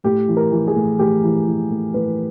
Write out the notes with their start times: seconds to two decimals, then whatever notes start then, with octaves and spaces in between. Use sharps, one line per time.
0.04 A2 G4
0.28 E3
0.37 A#4
0.52 E3
0.68 G#4
0.75 A2
0.99 A2 G4
1.24 E3
1.47 E3
1.70 A2
1.94 A2 B4